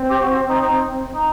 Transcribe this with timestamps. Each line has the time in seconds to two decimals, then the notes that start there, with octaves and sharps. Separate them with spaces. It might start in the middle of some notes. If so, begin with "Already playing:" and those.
Already playing: C4
0.10 G4
0.23 F#4
0.49 D#4
0.62 D#4
1.14 D#4